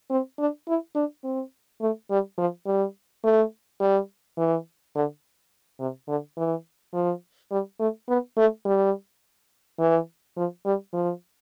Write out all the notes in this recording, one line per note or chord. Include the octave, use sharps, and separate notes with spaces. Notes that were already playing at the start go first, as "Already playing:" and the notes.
C4
D4
E4
D4
C4
A3
G3
F3
G3
A3
G3
E3
D3
C3
D3
E3
F3
G3
A3
B3
A3
G3
E3
F3
G3
F3